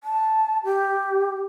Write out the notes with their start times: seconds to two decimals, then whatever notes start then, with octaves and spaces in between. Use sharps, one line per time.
0.04 A5
0.64 G4